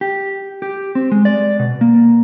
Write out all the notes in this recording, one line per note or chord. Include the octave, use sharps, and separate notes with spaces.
G4
G4
C4
G#3
D5
B2
A#3